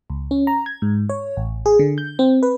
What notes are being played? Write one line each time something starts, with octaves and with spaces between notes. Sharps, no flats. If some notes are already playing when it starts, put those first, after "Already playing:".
C#2
C#4
A#5
G#6
G#2
C#5
A1
G#4
D3
G6
C4
B4